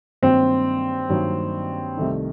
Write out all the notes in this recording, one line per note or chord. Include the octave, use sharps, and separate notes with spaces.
G2 D#3 F#3 A#3 C4 D#4
G2 D#3 F#3 A#3 D#4
C2 C3 D#3 A3 D#4